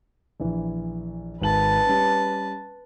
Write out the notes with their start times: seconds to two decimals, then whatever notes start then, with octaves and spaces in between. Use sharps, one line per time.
0.40 A#1 E3
1.42 G#1 B4 A5 F#7
1.87 G3 C#4